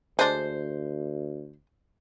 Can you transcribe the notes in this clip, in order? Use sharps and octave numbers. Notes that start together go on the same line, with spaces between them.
D2 G#3 D4 C5